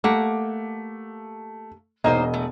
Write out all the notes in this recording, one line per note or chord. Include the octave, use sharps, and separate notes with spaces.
A3 A#3 G4 F#5
E1 A#3 D#4 C5 D#5
A3